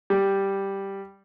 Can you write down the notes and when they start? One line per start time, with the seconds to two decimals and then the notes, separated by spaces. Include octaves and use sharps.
0.10 G3